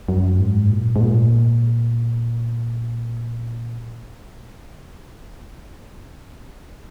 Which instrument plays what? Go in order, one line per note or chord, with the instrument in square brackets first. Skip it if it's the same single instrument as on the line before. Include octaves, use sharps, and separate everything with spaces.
[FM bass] F#2
G#2
A#2
G#2
A#2